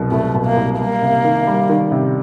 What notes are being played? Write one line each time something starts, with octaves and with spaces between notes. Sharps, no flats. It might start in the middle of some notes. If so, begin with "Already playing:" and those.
Already playing: C2 B2 F#3
C2 A3
B2
A#3
C2
G3 A#3
C3
D#3
G3
D#3
C3